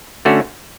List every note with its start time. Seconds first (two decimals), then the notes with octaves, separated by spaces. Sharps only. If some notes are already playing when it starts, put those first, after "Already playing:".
0.25 D3 A3 C#4 F#4